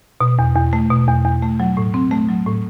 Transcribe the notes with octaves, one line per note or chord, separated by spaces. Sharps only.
B2
E2
E2
A3
B2
E2
E2
A3
F#3
A2
C4
A3
F#3
A2